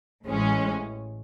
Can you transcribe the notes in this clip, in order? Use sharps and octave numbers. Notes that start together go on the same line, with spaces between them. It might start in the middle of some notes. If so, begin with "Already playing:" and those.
A1 A2 G#3 C#4